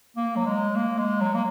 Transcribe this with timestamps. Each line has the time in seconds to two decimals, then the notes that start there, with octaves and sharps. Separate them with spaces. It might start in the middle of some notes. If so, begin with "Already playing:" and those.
0.17 A#3
0.36 F#3
0.46 G#3
0.76 A#3
0.98 G#3
1.21 F#3
1.34 A#3